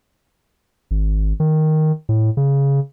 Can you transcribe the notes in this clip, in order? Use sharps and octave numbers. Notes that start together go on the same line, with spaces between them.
G#1
D#3
A2
C#3